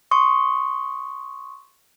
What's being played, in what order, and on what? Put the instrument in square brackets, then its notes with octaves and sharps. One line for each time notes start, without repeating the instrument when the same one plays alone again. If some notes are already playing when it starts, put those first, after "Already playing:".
[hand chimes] C6 C#6 D#6